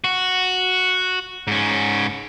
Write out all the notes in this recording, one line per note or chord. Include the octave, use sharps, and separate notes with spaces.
F#4
G#2 C#4